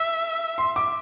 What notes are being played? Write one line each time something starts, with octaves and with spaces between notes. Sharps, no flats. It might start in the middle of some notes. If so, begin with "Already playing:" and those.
Already playing: E5 E6
C6
D6